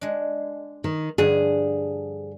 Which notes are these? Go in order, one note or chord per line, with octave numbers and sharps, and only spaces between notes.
G#3 D4
D#3
G2 D3 F3 G#4